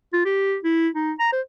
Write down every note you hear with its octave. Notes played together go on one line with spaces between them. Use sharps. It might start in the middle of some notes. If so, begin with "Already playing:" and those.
F4
G4
E4
D#4
A#5
C5